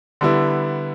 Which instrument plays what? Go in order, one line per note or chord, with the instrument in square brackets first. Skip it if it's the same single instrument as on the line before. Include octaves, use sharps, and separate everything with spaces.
[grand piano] D3 G3 B3 E4